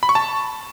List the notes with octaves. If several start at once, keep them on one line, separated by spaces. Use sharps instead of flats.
B5
C#6
A5